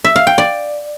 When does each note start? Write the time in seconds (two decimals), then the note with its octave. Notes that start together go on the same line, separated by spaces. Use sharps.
0.04 E5
0.16 F5
0.27 G5
0.38 D5